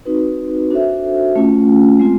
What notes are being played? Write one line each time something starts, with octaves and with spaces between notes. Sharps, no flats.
C4 D#4 F#4 B4
D4 F#4 A4 C5 E5
A3 C#4 F4
G#3 C4 F4